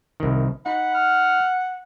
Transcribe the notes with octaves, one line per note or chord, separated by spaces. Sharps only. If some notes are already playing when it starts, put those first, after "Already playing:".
C2 D#3
D#4 F#5 B5
F6